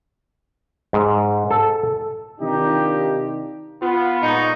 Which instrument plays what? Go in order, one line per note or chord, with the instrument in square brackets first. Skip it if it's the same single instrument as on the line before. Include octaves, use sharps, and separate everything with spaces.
[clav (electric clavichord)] G#2
A4
[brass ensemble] C3 D#3 D4 D#4 F4 G4
[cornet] B3 [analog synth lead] F4
[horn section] A#2 G#3 D#4 [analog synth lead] C#6